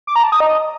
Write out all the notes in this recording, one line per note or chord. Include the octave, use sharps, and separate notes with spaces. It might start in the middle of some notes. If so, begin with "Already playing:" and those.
D6
A#5
A5
D#6
D#5